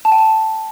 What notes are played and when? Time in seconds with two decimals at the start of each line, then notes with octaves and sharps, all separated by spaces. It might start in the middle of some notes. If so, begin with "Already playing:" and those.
0.05 A5
0.12 G5
0.18 A5